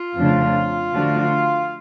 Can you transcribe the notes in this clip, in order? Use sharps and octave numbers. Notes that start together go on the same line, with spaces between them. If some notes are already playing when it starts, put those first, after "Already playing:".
Already playing: F4
F2 C#3 F3 A3 D4
D3 F3 A3 D4 F#4